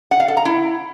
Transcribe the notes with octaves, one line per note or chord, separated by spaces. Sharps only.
F#5
F5
A4
A#5
E4